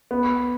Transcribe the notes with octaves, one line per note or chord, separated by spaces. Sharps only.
B3